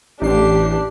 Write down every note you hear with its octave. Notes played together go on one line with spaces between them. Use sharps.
A1 D4 G4 C7